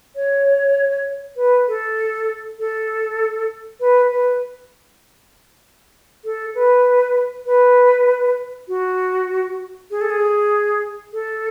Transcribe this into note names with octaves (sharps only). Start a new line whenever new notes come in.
C#5
B4
A4
A4
B4
B4
A4
B4
B4
F#4
G#4
A4
G#4
A4